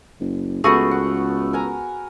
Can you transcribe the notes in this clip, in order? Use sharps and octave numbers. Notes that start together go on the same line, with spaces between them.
F#1
C#2 A3 B3 F#4 G#4
F#5
A#4 G#5 A#5